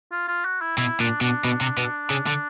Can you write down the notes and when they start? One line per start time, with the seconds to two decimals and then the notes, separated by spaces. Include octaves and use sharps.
0.11 F4
0.28 F4
0.45 F#4
0.61 E4
0.78 B2 E4
1.00 A#2 D4
1.21 B2 D4
1.45 B2
1.61 C3
1.78 B2
2.10 C#3
2.27 D3